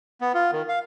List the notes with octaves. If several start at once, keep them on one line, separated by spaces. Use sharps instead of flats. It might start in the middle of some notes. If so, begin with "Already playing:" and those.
B3
F4
D#3
F5